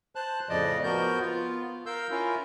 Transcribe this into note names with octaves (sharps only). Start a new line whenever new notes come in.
C5 A5 F#6
F2 A2 C#3 F3 D5 D#5
F3 B3 F#4 A#4 G6
B3 F4
A#4 F5 E6 G6
C#4 E4 F4 A#4